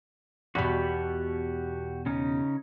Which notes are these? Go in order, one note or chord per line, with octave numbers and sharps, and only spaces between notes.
E2 B2 F#4 G4 B5
C#3 C#4 D#4